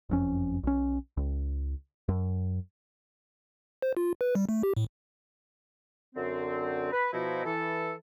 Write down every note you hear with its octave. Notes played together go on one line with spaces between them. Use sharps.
F#1 F2 C#4
B1 C#4
C#2
F#2
C5
F4
B4
G3
A3
G4
A2
F#2 D3 C4
B4
B2 F3 D#4 E4
E3 A4